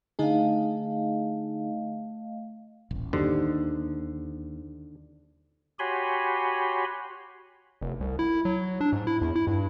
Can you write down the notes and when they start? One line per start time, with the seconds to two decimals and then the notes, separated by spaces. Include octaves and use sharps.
0.19 D3 A3 D#4 G#4 D#5 F5
2.91 D#1 A1
3.13 D#2 D3 D#4 G4 C5
5.79 F#4 G4 C#5 G#5 B5 C6
7.82 F1
8.00 C2
8.19 E4
8.45 F#3
8.81 D4
8.92 G#2
9.07 E4
9.21 E2
9.36 E4
9.47 G2